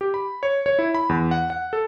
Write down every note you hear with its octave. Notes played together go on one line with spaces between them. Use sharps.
G4
B5
C#5
C#5
E4
B5
E2
F#5
F#5
A4